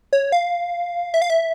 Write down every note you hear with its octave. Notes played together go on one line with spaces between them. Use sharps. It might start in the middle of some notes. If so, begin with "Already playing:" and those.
C#5
F5
E5
F5
E5